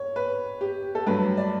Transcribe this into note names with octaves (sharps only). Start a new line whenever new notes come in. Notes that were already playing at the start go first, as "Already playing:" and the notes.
Already playing: C#5
B4
G4
A4
G2 F#3 A3 B4
D5